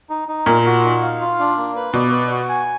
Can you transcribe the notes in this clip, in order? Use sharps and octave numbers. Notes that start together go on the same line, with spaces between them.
D#4
D#4
A#2 A#4
F#4
D#4
F5
F4
D4
A#3
B4
B2 D5
B4
F#4
G#5